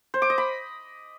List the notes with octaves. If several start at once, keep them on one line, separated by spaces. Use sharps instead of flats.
C5
D6
D#5
B5